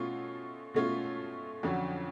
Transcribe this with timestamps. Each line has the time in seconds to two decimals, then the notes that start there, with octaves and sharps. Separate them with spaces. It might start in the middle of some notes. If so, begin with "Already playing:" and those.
Already playing: B2 A3 C#4 F4
0.74 B2 A3 C#4 F4
1.63 F2 D3 F#3 C#4